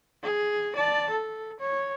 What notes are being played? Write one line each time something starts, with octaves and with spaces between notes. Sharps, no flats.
G#4
D5 A5
A4
C#5